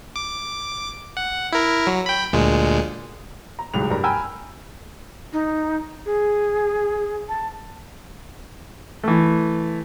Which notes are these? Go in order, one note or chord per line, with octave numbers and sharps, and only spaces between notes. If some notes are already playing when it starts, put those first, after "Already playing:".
D6
F#5
E4 A#4
F#3
G5 B5
D2 A#2 G#3
A#5
D1 C2 G#2 F7
G2 A#4 A#5
G5 G#5 A#5 B5 E6 F6
D#4
G#4
A5
E3 A3